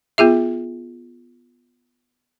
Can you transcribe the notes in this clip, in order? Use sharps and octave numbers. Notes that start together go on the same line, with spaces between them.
B3 F4 G#4 E5